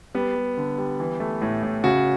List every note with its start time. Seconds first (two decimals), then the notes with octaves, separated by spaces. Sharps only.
0.15 G3 B3
0.36 G3
0.57 D3
0.78 G3
1.00 E3
1.20 A3
1.42 A2
1.63 A2
1.84 C#3 F#4